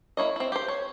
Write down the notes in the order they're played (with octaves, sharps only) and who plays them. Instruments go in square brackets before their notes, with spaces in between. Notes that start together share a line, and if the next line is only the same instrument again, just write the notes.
[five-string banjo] A#3 E4 C#5 D#5
C4 E4
G4 C5
C#5